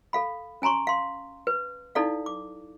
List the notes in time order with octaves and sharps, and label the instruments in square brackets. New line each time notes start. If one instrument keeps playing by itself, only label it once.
[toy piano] A4 F5 B5
C#4 G#5 A#5 C6 C#6
F5 C6
B4
D#4 E4 A4 D5 F5
D6